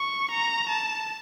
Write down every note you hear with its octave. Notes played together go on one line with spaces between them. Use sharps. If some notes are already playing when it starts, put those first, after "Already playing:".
Already playing: C#6
A#5
A5